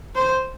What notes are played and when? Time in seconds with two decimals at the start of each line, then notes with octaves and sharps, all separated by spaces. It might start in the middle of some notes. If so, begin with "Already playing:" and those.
0.15 C5